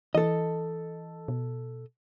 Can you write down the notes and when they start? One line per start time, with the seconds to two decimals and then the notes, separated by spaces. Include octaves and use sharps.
0.15 E3 A4 D#5
1.28 B2